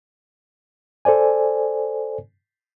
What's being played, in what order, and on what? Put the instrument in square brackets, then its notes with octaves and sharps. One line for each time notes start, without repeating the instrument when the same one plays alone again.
[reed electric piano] A4 C5 D5 G#5